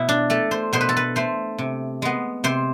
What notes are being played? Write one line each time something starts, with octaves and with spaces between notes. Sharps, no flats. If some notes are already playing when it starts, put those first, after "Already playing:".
Already playing: B2 E4
D4
A3 A4
C5
B2 C5
B4
A4
B4
A3 C5
C3
G#3 B3
C3 C5